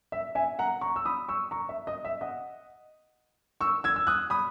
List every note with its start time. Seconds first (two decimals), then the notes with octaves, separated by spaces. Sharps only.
0.12 E5
0.35 E5 G#5
0.59 F#5 A#5
0.81 A#5 C#6
0.96 E6
1.05 B5 D#6
1.29 C#6 E6
1.51 A#5 C#6
1.69 E5
1.87 D#5
2.05 E5
2.21 D#5 F#5
3.61 C#6 E6
3.84 E6 G#6
3.96 E6
4.07 D#6 F#6
4.30 B5 D#6